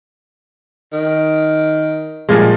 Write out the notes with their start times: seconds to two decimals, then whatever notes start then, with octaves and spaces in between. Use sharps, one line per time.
0.92 D#3
2.29 A#2 F3 G3 G#3